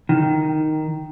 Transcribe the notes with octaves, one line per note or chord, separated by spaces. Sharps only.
D#3